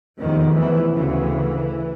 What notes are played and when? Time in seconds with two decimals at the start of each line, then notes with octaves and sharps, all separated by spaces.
0.19 F1 E2 C3 D#3
0.56 E3
0.93 D2 C#3 E3